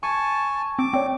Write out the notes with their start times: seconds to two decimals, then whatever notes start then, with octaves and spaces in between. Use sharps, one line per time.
0.03 G#5 A5 C#6
0.79 C4 D6
0.94 C4 C#5 D5 G5